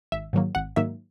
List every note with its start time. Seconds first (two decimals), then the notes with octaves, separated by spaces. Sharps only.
0.12 G#1 E5
0.33 G#2 D#3 F#3 A#3
0.55 G#1 F#5
0.76 G#2 D#3 F#3 A#3 E5